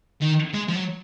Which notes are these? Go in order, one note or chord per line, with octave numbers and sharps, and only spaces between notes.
D#3
G#3
F3
F#3